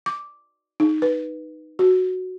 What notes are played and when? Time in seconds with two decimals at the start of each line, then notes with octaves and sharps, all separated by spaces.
0.06 D6
0.80 D#4
1.02 B4
1.79 F#4